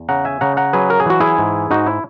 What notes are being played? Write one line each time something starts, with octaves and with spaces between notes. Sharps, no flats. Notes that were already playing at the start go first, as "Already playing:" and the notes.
Already playing: E2
C#3 F#5 A#5
E5 G#5
C#3 F#5 A#5
F#5 A#5
F#3 G#4 B4
A#4
G#4
E3 F#4
E4 G#4
G#2
G#2 D#4 F#4
E4